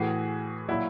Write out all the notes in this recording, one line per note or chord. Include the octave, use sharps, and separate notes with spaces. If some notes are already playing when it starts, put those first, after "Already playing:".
Already playing: A2 E3 F#4 G#4
A#2 F#3 E4 F#4